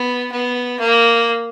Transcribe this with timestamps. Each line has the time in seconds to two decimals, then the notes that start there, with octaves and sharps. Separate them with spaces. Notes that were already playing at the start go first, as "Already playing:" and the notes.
Already playing: B3
0.31 B3
0.80 A#3